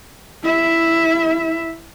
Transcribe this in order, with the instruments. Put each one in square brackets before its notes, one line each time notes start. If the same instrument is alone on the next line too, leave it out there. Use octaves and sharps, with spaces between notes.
[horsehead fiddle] E4 E5